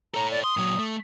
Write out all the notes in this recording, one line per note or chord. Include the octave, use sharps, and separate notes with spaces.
A4 C#5 A#5
D5
C6 D#6
A#2 F#3
A3